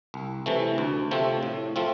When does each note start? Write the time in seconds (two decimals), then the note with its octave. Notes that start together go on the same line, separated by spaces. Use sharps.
0.14 C2
0.46 C3 E3 A3
0.78 D2
1.11 C3 F3 A3 C4
1.43 A2
1.76 F3 A3 C4 F4